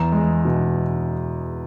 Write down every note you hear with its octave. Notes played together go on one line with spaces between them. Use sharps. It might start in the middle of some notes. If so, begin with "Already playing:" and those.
Already playing: E2 A#5
G#3
B2